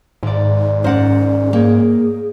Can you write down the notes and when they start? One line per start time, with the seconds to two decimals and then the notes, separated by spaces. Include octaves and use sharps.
0.23 G#1 G#2 D5
0.84 C#4 A#4 C5 D5 F#5
1.53 A#3 G#4 C#5 G5